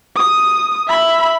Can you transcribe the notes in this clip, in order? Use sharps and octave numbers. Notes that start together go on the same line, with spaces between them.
D#6
E5 B5